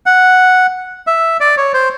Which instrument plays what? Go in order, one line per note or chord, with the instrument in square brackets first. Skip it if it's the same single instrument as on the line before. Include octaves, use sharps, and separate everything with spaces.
[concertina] F#5
E5
D5
C#5
C5